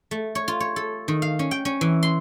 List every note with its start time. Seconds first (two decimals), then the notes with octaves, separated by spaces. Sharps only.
0.11 A3
0.35 C#5
0.48 F4
0.60 C#5
0.76 A4
1.08 D#3
1.22 F5
1.39 C#4
1.51 G5
1.65 C#4
1.81 E3
2.03 C6